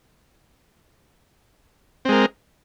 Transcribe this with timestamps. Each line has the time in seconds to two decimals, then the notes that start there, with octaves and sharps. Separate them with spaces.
2.05 C4
2.09 G#3
2.12 A#4